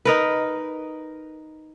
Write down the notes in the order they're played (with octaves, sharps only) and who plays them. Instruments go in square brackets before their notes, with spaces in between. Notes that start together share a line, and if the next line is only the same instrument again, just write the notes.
[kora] D#4 A#4 B4